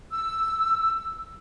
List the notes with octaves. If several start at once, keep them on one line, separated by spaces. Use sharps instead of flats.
E6